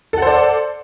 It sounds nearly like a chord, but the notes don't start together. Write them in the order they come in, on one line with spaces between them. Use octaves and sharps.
A4 F#5 C5 D5